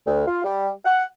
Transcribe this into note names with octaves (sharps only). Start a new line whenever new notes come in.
D2
F4
G3
F#5